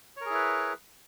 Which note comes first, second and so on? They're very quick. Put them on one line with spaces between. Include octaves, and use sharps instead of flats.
C#5 A#4 G#4 E4 B4